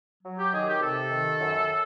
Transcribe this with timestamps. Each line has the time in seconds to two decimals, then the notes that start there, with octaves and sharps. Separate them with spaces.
0.23 F#3
0.38 G4
0.53 D#3 G#4
0.67 G4
0.81 C3 A4
1.10 D#3
1.39 F#2